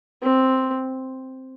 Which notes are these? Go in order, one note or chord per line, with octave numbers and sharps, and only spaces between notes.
C4